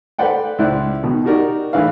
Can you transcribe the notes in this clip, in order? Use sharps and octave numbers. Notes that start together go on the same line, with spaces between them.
A4 B4 C5 D5 F#5 G5
C#2 E4 C5 D5 F#6
B2 D#3
D#4 F#4 G4 A#4 D5
A2 E3 G#3 B4 F5